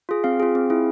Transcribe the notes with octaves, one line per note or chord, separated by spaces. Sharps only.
F4 G#4
C4 F5
F4 G#4
C4
E4 G#4